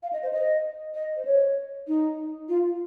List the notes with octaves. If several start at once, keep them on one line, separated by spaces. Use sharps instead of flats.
F5
D#5
C5
D#5
D#5
C5
C#5
D#4
F4